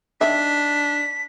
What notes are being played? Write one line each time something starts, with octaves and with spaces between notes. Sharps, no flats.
D#3 D4 E5 B6